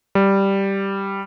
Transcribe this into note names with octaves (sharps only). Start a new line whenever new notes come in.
G3